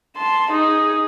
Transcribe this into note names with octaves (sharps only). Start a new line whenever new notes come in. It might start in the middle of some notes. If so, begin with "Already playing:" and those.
A5 C6
D#4 G#4